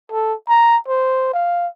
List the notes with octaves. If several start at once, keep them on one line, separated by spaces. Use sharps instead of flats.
A4
A#5
C5
F5